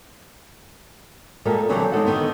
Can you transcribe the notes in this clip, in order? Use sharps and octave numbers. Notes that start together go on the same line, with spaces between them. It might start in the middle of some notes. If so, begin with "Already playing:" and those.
A#2 G3 G#3 A4 A#4
A#2 D3 E3 F#3 G3 C4
G#3 D#4 A4 C5 F#5
D3 D#3 B3 D#4